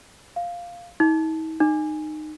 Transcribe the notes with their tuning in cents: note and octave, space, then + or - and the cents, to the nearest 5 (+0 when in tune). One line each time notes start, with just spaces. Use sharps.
F5 +0
D#4 +45
D#4 -20